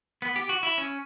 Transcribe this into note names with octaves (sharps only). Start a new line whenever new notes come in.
B3
G4
F#4
E4
C#4